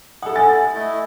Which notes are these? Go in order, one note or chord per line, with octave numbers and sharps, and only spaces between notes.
E4 A4 F#5 D#6
E5 G#5 A6
A3 E4 D#5